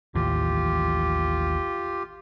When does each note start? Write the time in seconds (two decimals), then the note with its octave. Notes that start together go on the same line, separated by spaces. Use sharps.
0.15 A1 D#2 E3 F4 G4